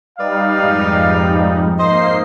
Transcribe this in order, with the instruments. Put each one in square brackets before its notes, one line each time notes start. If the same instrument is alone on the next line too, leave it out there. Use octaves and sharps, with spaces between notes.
[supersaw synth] G3 D#4 [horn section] B4 D5 F5
[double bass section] F2 G#2 G#3
[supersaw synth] A#3 D#4 C7 [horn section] C5 D#5